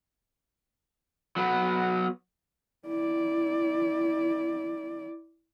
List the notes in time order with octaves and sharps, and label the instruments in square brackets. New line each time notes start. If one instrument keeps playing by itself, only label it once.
[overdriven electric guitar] F#3 B3
[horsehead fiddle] E4 D5